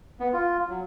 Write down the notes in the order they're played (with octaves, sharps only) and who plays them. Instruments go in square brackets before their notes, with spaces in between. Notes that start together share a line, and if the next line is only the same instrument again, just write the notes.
[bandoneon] B3
F4
F#3